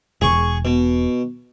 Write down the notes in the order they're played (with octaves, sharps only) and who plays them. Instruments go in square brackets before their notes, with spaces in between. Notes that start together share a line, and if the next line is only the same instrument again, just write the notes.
[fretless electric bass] E1 [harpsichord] G#4 C#6
[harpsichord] B2